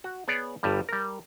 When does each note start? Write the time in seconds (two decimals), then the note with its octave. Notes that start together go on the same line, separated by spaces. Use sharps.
0.04 F#4
0.28 B3 G#4 C#5 D5
0.63 G1 G2 G3
0.89 G3 A#4